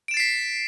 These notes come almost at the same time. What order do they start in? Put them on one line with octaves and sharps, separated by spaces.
D7 E7 A6 C7 B6